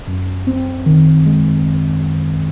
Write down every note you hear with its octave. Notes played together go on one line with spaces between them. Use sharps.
F#2
C4
D#3
G#3